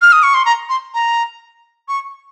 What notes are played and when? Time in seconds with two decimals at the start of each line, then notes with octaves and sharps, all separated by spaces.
0.02 F6
0.13 D#6
0.23 C#6
0.34 C6
0.45 A#5
0.69 C6
0.94 A#5
1.88 C#6